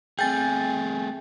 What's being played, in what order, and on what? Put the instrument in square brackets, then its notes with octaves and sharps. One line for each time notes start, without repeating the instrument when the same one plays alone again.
[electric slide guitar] A3 G#4 [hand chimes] C4 G#5 G6 [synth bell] G5 A6